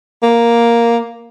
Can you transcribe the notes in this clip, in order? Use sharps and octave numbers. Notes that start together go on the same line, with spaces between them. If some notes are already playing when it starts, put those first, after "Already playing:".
A#3